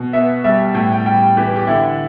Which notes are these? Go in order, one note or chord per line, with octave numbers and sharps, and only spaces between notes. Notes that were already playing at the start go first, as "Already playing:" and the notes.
Already playing: B2
B3 E5
G3 E5
A2 G5
G5
G3 G5
E3 G4
G4
D3 E4